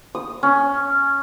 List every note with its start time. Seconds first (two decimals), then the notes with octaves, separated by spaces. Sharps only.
0.15 D#6
0.43 C#4